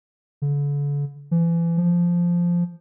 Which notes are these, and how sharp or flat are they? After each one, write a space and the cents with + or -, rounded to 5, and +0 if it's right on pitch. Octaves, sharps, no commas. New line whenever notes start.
D3 -40
E3 +35
F3 -5